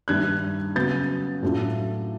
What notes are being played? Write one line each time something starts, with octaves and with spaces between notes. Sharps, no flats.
G2 D#3 G3 F#6 G#6
C#3 F#3 B3 G6 A6
A2 F#3 A3 D4 F4